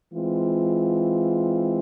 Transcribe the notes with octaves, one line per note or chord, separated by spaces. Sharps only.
E3 G#3 C4 F4